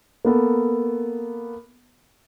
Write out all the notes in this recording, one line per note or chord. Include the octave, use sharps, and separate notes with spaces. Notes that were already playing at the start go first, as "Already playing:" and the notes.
A#3 B3 A4